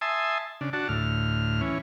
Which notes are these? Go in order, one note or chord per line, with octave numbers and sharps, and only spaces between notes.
E5 G#5 A5 C6 D#6
C#3 D4
D4 F#4 A5
D2 A2 F6
E3 C#4